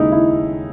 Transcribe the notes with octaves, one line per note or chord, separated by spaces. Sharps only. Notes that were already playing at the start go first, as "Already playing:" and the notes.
Already playing: D#2 C#3 G#3 D#4 E4
E4